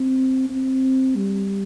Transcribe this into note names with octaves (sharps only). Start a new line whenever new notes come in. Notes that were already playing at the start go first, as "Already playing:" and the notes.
Already playing: C4
C4
G3